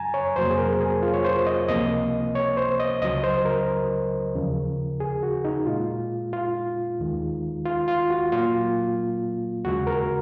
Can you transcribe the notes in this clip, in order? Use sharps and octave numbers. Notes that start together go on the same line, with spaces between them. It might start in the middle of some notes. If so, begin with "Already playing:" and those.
Already playing: F#2 C#3 F#3 G#5 A#5
C#5
F2 C3 F#3 A#3 C5
G#4
A#4
G#4
F4
C#5
C5
D#5
C#2 C3 F3 A#3 D#5
C#5
C5
D#5
C#2 C#3 F#3 D#5
C5
A#4
D#2 C#3 F3
G#4
F#4
D#4
A#2 G#3 F4
F4
D#2 D#3 G#3
F4
F4
F#4
A#2 F#3 A#3 F4
D#2 C#3 G#3 F#4
A#4